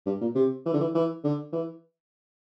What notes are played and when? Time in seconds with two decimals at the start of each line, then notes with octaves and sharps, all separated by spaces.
0.06 G2
0.21 A#2
0.35 C3
0.66 E3
0.74 D3
0.81 E3
0.95 E3
1.24 D3
1.53 E3